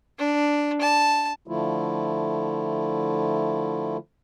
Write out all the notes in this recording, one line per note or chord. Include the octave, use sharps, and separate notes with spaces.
D4
A5
D3 F3 A3 E4 F4